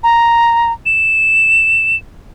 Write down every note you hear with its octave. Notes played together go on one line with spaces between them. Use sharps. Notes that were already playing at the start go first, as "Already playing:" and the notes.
A#5
E7